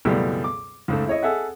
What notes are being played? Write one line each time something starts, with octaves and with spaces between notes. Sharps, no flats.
C#2 F#2 B2 E3 G3 A3
D6
C#2 G#2 A3
E4 C#5 D#5
G#4 A4 E5 F#5